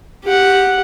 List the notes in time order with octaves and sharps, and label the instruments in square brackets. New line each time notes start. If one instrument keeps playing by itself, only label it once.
[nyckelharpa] G4 F#5